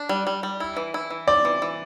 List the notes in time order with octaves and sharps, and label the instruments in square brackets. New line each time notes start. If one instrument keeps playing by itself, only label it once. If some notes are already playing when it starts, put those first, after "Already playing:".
Already playing: [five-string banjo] D4
G3
G3
G3
E4
E3
E4
E3
[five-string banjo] C4 [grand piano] D5
[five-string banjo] E3
E3